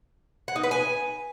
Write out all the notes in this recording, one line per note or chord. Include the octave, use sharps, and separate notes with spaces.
F#5
D#4
B4
G#5